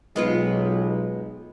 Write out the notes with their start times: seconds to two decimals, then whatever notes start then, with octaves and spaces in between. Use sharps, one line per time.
0.16 B1 G#3 B3 F4